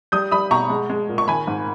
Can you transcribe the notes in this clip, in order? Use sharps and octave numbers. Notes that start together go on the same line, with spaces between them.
G3 D#6 G6
G3 B5 D#6
B2 A#5 C#6
G#3
G#3
A#2
C#6
D#3 G#5 B5
G#2